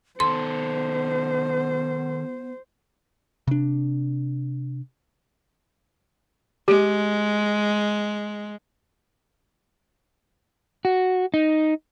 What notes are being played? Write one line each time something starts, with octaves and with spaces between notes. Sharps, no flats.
D#3 B3 A4 C5 C6
C3 D4
G#3 G4
F#4
D#4